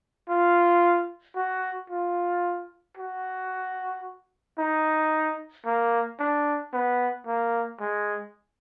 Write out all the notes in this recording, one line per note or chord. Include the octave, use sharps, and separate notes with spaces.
F4
F#4
F4
F#4
D#4
A#3
D4
B3
A#3
G#3